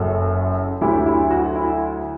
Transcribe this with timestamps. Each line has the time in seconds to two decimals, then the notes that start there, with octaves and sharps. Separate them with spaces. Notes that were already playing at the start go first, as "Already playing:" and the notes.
Already playing: F#1 F#2 F#3 F#4 A4
0.81 D2 D3 F#3 E4 G4
1.06 E4
1.30 F#4
1.55 E4